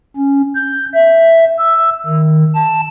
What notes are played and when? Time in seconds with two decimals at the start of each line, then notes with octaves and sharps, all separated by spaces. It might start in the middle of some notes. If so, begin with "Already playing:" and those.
0.17 C#4
0.55 G6
0.94 E5
1.58 E6
2.06 D#3
2.55 A5